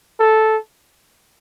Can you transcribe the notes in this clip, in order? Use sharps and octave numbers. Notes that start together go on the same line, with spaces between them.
A4